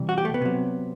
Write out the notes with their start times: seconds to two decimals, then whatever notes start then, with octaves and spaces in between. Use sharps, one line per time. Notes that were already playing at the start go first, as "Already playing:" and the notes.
Already playing: C3 E3 G3
0.09 F#4
0.18 G4
0.25 A3
0.34 B3
0.41 C3 F#3